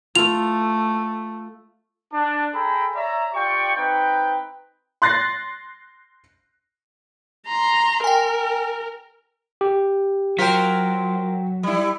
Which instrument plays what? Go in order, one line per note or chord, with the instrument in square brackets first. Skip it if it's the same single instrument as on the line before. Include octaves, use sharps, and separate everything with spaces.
[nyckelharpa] A3 [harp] F4 [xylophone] F7
[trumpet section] D4
G#4 A4 G5 G#5 A#5 B5
C#5 D5 E5 A#5
F4 G4 D5 G5 C#6
C4 D#4 B4 G5
[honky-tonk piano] C6 F#6 A6 A#6 C7
[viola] A#5 C6
[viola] A#4 [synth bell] G5 G#5
[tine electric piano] G4
[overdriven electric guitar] F#3 [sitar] F4 A#4 C5 [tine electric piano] G5 B6
[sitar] G3 E4